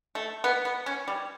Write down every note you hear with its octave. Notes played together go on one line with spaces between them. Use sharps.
A3
B3
B3
C#4
G3